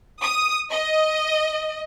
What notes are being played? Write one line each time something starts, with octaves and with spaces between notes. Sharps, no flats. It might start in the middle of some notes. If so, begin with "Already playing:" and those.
D#6
D#5